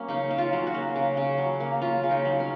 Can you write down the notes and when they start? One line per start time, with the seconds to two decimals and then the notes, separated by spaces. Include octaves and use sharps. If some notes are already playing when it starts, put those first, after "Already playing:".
Already playing: F#3 A#3 C#4
0.08 C#3 D#4
0.31 C#3
0.38 F4
0.53 F#3
0.67 F#4
0.74 A#3
0.96 C#3
1.17 C#3
1.38 F#3
1.60 A#3
1.82 C#3 F4
2.03 C#3
2.11 D#4
2.25 F#3
2.40 C#4